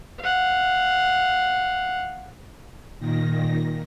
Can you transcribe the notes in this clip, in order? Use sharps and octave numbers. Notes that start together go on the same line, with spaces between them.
F5 F#5
A#2 D#3 A#6